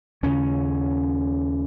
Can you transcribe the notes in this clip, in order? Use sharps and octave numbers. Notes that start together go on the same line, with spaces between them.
D#2 C#3 C#4